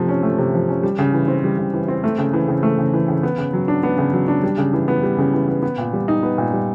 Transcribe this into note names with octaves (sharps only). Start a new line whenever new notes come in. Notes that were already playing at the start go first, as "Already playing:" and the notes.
Already playing: C3 F3 A3
C#4
A3
C3
F3
C#4
G3
C#3
E3
C4
G3
C#3
E3
C4
A3
C#3
E3
C#3
A3
C#3
E3
C#3
B3
C#3
F#3
D4
B3
C#3
F#3
D4
G3
C#3
E3
B3
G3
C#3
E3
B3
B3
A#2
G3
D#4
B3
A#2
G3